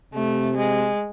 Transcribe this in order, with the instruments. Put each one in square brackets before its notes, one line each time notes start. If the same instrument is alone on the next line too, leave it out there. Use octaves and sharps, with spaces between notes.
[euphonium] C3 [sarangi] A3
[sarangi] G#3